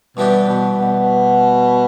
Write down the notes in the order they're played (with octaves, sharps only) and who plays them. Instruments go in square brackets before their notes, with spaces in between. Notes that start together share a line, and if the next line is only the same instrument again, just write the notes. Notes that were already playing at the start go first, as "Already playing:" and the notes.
[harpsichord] G2 E3 B3 D4 G4 [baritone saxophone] B2
[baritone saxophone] B2
B2